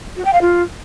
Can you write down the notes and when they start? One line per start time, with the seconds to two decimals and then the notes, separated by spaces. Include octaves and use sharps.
0.16 F#4
0.24 G5
0.33 F5
0.41 F4